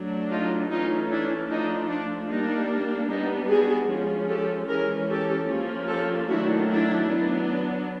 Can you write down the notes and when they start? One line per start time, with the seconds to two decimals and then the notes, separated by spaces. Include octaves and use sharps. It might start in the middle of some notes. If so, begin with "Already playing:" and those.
Already playing: F#3 A3 D4
0.30 D#4 F4
0.70 E3 A3 C#4 D#4 F4
1.10 D4 E4
1.50 F3 A3 D4 D#4
1.89 D4
2.30 G3 A#3 D4 D#4
3.09 G3 B3 D4 D#4
3.49 F#4 G#4
3.89 F3 G#3 C#4
4.28 G4 A4
4.68 E3 G#3 C#4 G#4 A#4
5.09 G4 A4
5.48 F3 A#3 C#4
5.88 G4 A4
6.28 D#3 F#3 A3 D4 E4 F#4
6.68 D4 E4
7.08 F#3 B3 D4